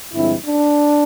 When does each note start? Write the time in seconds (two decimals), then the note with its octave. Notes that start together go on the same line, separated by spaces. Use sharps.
0.13 G2 D3 F3 G#3 C4 E4
0.45 D4